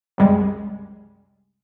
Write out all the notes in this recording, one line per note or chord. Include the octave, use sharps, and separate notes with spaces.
C2 F#2 G3 G#3